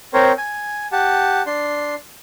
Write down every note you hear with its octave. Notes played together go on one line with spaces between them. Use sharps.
C4 A#4 C5 C#5
G#5
G4 F#5 A5
D4 C6